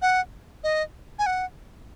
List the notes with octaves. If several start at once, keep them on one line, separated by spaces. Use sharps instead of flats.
F#5
D#5
G#5
F#5